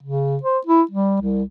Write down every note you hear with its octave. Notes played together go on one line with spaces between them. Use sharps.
C#3
C5
E4
G3
C2